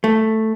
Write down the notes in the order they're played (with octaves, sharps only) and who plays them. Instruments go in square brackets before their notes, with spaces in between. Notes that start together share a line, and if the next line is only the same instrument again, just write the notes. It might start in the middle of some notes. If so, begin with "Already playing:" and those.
[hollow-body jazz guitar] A3